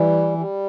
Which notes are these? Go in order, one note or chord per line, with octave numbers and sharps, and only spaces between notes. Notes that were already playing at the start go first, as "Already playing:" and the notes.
Already playing: E3 G3
G3